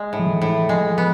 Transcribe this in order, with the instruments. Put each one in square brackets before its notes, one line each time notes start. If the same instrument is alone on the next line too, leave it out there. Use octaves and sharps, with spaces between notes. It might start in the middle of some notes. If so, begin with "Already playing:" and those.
Already playing: [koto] G#3
A2
[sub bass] F3
E3
[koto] A2
[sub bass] F3 [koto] G#3
[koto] B3